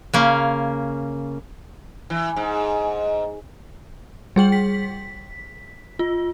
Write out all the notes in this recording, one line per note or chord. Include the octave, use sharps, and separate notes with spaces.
C#3 A#3 C#4
E3
G#2
G3 G#4 G5 F#7
B6
F4